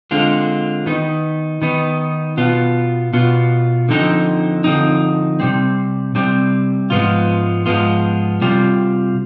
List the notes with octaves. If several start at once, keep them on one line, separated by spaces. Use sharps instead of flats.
D3 G#3 C4 F4
D#3 B3 D#4
D#3 B3 D#4
B2 B3 F4
B2 B3 F4
D3 F3 C4 D#4
D3 F3 C4 D#4
C3 G3 C4
C3 G3 C4
G#2 F3 G#3 B3 F4
G#2 F3 G#3 B3 F4
C3 G3 C4 F4